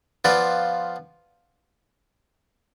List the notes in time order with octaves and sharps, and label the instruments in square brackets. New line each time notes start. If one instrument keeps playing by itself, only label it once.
[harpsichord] F3 B3 F4 B4 D5